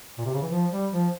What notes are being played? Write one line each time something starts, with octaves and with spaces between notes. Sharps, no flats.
A#2
C3
C#3
E3
F3
G3
F3